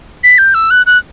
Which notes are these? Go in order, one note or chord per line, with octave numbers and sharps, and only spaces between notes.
B6
G6
E6
F#6
F#6